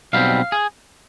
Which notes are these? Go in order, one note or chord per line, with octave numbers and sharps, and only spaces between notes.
B1 B2 G3 C4 F5
G#4